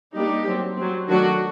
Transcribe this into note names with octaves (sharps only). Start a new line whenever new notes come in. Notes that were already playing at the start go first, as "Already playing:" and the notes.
G3 A#3 D4 D#4 G4
F#3 C4
F#3 C4
D#3 F#3 A3 D4 F#4